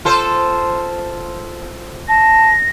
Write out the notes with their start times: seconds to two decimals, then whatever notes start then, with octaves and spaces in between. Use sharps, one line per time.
0.05 F4 A4 C5
2.09 A5 A#6